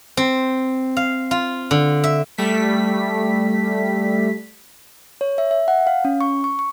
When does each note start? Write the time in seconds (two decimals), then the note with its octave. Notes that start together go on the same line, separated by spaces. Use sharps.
0.17 C4
0.97 F5
1.31 F4
1.71 D3
2.04 E5
2.38 G3 A3 B6
5.21 C#5
5.38 E5
5.51 E5
5.68 F#5
5.87 F5
6.05 C#4
6.21 C#6
6.44 C#6
6.59 C#6